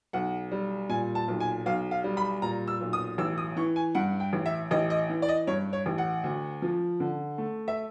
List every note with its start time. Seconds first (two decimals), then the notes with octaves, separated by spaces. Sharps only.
0.13 B1 F#5
0.52 G3
0.89 A#2 G#5
1.15 A5
1.28 B1
1.40 G#5
1.66 B1 F5
1.91 F5
2.04 G3
2.17 B5
2.42 A#2 A#5
2.68 E6
2.80 B1
2.93 D#6
3.18 A1 E6
3.38 D#6
3.56 E3 C#6
3.76 G#5
3.95 G2 F#5
4.20 G5
4.33 A1
4.46 E5
4.71 A1 D#5
4.90 D#5
5.09 E3
5.22 D5
5.29 D#5
5.47 G2 C#5
5.73 C#5
5.86 A1
5.98 F#5
6.23 D2
6.62 F3
7.00 D3
7.38 A3
7.68 E5